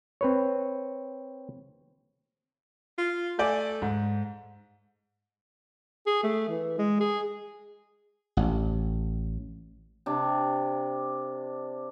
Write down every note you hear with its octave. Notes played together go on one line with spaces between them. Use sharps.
C4 B4 C#5
F4
A3 D5 G#5 G6
G#2
G#4
A3
E3
G#3
G#4
A1
C3 D4